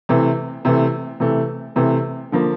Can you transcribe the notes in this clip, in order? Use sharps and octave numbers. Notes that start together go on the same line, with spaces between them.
C3 E3 A3
C3 E3 A3
C3 E3 A3
C3 E3 A3
D3 F3 A#3